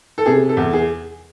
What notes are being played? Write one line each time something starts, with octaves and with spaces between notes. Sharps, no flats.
A4
C3 G#4
A4
E2
G#4